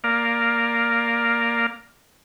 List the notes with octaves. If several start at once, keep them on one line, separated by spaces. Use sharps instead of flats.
A#3 A#4 D5 F5